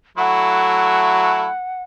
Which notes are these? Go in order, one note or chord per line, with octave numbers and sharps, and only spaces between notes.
F#3 A3 E4 F#5